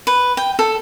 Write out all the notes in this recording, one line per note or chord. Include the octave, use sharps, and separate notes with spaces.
B4
G5
A4